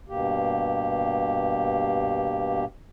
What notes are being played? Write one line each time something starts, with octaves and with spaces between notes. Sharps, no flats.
G2 B2 A#3 G4